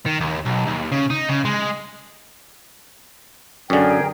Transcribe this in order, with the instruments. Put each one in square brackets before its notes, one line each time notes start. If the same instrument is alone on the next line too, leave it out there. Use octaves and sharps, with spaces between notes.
[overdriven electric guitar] D#3
D#2
B1
D#2
C#3
D#4
C#3
G#3
[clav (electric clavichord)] F#2 D3 [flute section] G#4 A#4 G5